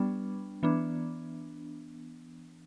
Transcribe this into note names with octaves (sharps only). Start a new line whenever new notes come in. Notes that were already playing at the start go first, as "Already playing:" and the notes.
Already playing: G3 B3 D4
E3 B3 D4